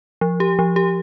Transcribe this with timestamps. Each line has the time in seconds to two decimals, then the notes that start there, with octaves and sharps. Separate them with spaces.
0.21 F3
0.40 G4
0.59 F3
0.76 G4